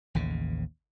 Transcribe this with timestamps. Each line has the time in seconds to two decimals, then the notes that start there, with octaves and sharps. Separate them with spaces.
0.15 A1 D#2 C#3